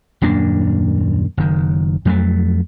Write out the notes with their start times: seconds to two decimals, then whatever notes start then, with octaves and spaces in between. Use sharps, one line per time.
0.22 D#1 F#2 A#3 D4
1.37 F#1 D#3
2.05 F2 F#3 A3